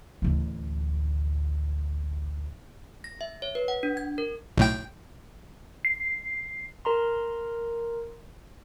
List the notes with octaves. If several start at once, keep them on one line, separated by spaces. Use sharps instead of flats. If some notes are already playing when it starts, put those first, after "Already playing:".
A1 D2
A#6
E5
C#5
B4
F#5
D4
G#6
A#4
B1 A2 G5
C7
A#4 A#5 C6